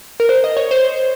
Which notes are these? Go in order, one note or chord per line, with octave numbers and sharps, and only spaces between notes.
A#4
C5
D#5
C#5
C5